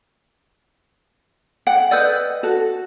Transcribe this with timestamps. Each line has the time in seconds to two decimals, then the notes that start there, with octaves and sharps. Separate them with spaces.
1.67 F#5 G5
1.91 B4 D5 D#5 E6 G6
2.43 F#4 A4